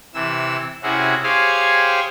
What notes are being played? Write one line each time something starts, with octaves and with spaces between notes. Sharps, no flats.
C3 E3 E6
C3 C#4 E4 F#4 G#4
G4 G#4 C5 C#5 F5 G#5